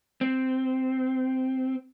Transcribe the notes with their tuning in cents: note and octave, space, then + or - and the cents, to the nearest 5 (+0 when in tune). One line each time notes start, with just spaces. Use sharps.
C4 -10